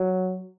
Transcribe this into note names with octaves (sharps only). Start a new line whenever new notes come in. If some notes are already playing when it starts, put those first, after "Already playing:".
Already playing: F#3